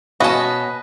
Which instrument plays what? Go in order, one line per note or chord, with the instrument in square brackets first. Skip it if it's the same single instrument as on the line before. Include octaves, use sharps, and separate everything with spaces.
[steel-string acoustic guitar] B2 A5 [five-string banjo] C#4 F#4 [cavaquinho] B4 F#5 [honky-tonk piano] D#5 G#5